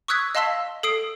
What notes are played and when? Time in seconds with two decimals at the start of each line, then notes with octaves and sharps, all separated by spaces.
0.08 C#6 D#6 E6 F#6 G#6 B6
0.35 D#5 F5 A5 C6 E6 B6
0.83 A4 D#6 C7 D7